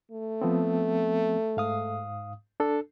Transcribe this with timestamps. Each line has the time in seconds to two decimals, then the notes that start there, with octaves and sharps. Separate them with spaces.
0.11 A3
0.41 F3 B3 C4
1.57 G#2 F5 D#6
2.60 D4 A4